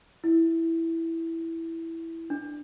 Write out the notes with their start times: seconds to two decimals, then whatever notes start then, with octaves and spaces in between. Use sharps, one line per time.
0.24 E4
2.30 D4